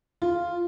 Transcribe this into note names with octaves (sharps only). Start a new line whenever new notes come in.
F4